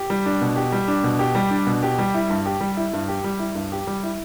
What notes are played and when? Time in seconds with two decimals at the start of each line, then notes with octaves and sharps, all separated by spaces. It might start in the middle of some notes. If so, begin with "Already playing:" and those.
Already playing: G4
0.10 G3
0.26 D4
0.41 B2
0.56 G4
0.72 G3
0.88 D4
1.04 B2
1.19 G4
1.35 G3
1.51 D4
1.67 B2
1.83 G4
1.98 G3
2.14 E4
2.30 G2
2.46 G4
2.61 G3
2.77 E4
2.93 G2
3.08 G4
3.24 G3
3.39 E4
3.55 G2
3.72 G4
3.87 G3
4.03 E4